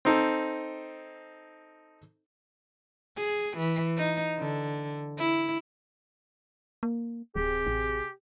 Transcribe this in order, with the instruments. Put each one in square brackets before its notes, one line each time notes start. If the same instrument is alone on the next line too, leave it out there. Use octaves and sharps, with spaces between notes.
[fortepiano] C4 D#4 A4
[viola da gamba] G#4
E3
D#4
D3
E4
[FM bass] A#3
[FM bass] D1 [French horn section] C3 G#4 [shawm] G4
[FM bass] A1